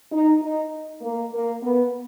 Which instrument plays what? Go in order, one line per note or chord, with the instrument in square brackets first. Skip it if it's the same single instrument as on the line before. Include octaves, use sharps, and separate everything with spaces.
[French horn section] D#4
D#4
A#3
A#3
B3